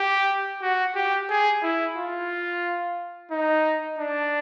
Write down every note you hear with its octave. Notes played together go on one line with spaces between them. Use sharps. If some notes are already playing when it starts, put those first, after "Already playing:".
Already playing: G4
F#4
G4
G#4
E4
F4
D#4
D4